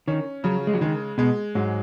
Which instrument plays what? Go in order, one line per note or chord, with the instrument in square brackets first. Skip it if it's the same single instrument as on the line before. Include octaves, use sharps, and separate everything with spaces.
[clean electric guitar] D#3 [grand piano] C#4
[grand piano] C#3 [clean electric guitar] F#3
[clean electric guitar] G#3
F#3
[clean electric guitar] D#3 [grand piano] G#3
[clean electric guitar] B2 [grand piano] G#3
[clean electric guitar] G#2 [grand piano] F#3